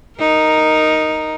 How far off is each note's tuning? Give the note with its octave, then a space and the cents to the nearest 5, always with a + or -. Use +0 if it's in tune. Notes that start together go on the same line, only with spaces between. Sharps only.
D#4 +0 A#4 +0